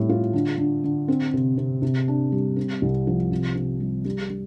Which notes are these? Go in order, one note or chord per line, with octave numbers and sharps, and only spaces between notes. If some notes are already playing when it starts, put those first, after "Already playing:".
Already playing: A2 G3 C4
F4
D3
D3
D3
C4
C3
C3
C3
D4
G3
C4
C2
F3
C3
C3
G3
G3
G3